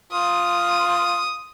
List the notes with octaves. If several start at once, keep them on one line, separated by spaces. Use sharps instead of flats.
F4 D#6